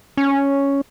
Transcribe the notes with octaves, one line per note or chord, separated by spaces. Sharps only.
C#4